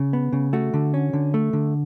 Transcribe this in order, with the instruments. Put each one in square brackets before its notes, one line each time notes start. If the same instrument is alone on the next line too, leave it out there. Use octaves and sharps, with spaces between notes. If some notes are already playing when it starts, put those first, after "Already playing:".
Already playing: [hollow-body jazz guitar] C#3
B3
C#3
A3 F#4
D3
C#4
D3
A3
D3